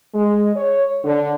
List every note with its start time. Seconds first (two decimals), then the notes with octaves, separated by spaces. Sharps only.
0.13 G#3
0.56 C#5
1.04 D3